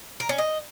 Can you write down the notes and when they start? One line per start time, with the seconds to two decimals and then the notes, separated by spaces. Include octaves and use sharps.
0.20 A#4
0.29 C#4
0.38 D#5